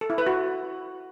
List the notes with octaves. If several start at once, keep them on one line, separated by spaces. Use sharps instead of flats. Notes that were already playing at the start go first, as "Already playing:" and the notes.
A4
E4
B4
F#4